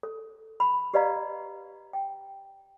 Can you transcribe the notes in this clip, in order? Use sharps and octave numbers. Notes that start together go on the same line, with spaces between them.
A4
B5
G4 B4 D5 D#5 F5 A#5
G5